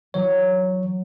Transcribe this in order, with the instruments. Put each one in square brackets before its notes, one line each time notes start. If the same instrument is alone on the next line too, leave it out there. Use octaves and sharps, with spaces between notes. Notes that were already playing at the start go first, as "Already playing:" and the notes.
[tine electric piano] E3 C#5 [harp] F#3